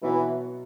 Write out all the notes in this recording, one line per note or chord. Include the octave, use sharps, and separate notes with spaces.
B2 E3 F#3 B3 F#4